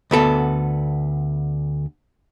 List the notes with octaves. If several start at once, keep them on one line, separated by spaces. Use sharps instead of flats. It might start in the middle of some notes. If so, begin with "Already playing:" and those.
D2 B3 A4